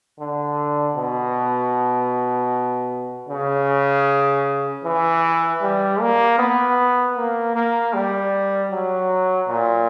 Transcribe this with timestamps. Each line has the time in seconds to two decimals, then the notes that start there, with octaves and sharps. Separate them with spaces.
0.19 D3
0.96 B2
3.29 C#3
4.84 E3
5.62 G3
6.00 A#3
6.38 B3
7.17 A#3
7.56 A#3
7.94 G3
8.71 F#3
9.49 A#2